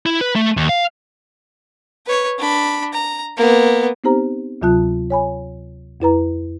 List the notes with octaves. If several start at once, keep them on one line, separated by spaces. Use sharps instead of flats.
E4
B4
A3
D#2
F5
B4 C#5
D4 B5
A#5
A#3 B3
B3 C4 D#4 G4 C5 A#5
D2 C3 F#3 F4 A5 F#6
C#5 G#5 B5
F2 E4 B4 A#5